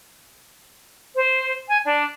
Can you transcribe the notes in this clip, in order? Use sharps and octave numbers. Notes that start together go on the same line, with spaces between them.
C5
G#5
D4